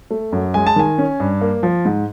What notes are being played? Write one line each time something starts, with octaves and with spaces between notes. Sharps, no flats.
A3
F#2
G#3 G#5
A5
D#3 G#5
C#4
G2
A#3
F3
G#2